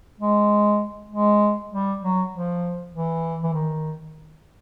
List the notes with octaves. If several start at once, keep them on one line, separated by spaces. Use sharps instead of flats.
G#3
G#3
G3
F#3
F3
E3
E3
D#3